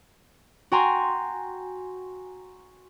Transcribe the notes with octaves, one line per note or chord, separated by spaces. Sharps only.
F#4 G5 G#5 A#5 C6